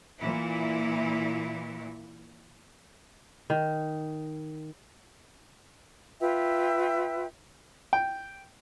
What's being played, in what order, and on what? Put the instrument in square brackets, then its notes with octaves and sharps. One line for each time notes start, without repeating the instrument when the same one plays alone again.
[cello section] A#2 E3 E4
[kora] D#3
[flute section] F4 B4 E5 G5
[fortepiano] G5